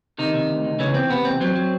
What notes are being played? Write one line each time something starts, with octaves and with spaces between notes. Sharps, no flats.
C3 D#3 D#4
C3
D2
D2
C#3 E3 C#4
E2 C4
C3 B3
E2 C4
F#3 C4
F#3